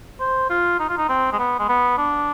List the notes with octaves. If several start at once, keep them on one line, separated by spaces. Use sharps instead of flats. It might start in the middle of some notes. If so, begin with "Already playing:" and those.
C5
F4
D#4
F4
D#4
C4
G#3
B3
G#3
B3
D4